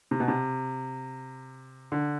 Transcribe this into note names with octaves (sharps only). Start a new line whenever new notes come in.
C3
B2
C3
D3